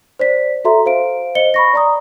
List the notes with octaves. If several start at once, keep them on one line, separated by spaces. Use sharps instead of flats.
C5 D5 B6
F#4 A4 E5 A#5 C6
C5 F5 D7
C5 D#5 C#7 G7
B5 C#6 A#6
D5 A#5 D#6